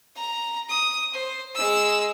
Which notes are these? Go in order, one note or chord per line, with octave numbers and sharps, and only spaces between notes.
A#5
D#6
C5
G#3 E6